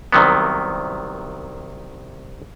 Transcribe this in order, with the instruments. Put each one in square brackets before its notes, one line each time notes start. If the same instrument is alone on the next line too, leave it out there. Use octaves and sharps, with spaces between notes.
[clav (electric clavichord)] C2 C3 D#3 F#3 B3